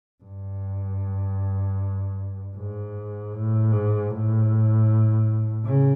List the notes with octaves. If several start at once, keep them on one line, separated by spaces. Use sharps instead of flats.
G2
G#2
A2
G#2
A2
C#3